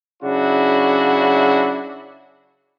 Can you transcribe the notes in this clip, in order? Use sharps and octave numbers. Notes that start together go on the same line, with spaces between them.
C#3 F#3 D4 E4 F#4